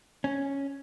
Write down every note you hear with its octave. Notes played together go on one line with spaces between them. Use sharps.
C#4